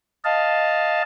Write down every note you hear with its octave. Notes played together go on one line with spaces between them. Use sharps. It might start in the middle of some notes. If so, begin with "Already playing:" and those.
D#5 F5 A5